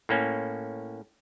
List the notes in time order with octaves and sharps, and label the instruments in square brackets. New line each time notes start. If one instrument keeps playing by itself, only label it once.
[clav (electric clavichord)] A2 A#3 C#4